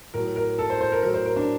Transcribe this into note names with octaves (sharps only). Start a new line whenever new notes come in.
A2 F#3 A#4
A#4
A4
C5
C5
A#4
A2 F#3 A#4
C5
A#4
D4